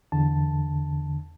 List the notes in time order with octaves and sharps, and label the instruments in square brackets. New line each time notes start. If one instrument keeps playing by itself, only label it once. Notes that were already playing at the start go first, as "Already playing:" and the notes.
[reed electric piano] E2 D3 A5